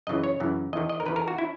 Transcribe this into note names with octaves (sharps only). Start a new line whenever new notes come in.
F#2 C#3 E3 D#5
C#5
F#2 C#3 E3
E2 D#3 D#5
D#5
A#4
E2 D#3 B4
A#4
F#4
E4